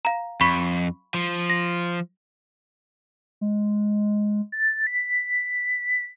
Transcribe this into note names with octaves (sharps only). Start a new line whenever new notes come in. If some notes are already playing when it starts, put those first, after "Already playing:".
F5 A#5
F2 B5 C#6 B6
F3
A#6
G#3
A6
B6